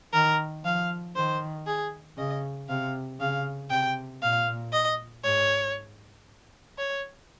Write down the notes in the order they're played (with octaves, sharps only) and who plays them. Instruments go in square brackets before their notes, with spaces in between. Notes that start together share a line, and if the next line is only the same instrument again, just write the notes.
[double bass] D#3 [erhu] A#4
[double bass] F3 [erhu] F5
[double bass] D#3 [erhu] C5
[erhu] G#4
[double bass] C#3 [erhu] D#5
[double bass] C3 [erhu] F5
[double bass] C#3 [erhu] F5
[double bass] C3 [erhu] G5
[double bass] A#2 [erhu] F5
[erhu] D#5
[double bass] G#2 [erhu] C#5
[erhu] C#5